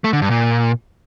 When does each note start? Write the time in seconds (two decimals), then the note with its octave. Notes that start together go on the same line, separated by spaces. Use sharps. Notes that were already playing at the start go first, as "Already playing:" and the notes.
0.04 A3
0.13 D3
0.22 G2
0.30 A#2